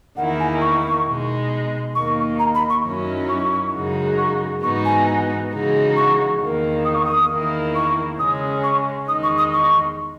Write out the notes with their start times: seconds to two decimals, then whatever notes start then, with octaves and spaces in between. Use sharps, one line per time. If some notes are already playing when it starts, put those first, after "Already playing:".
0.17 E2 D#3 A#3 E4 F#5
0.40 G#5
0.61 C#6
1.06 B2 G#3 D#4
1.95 D#2 D#3 A#3 D#4 C#6
2.39 A#5
2.55 B5
2.70 C#6
2.84 F#2 D#3 F#3 C#4 E4
3.29 C#6
3.74 F#2 C#3 G#3 D#4 F#4
4.18 C#6
4.62 G#2 E3 B3 D#4 F#4 C#6
4.85 G#5
5.52 C#3 E3 G#3 D#4 F#4
5.97 C#6
6.41 E2 D#3 A#3
6.85 D#6
6.95 C#6
7.05 D#6
7.30 E2 D#3 A#3 E4
7.75 C#6
8.19 C#3 G#3 C#4 D#6
8.64 C#6
9.08 E2 D#3 G#3 D#4 D#6
9.23 C#6
9.38 D#6
9.53 C#6